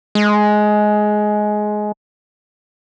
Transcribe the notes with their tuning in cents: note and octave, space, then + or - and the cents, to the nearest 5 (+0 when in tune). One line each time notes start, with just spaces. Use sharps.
G#3 +15